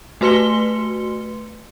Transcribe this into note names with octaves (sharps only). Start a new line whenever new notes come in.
A3 F#4 B4 C6 C#7 G7